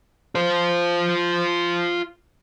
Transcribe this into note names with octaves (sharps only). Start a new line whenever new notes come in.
F4 C5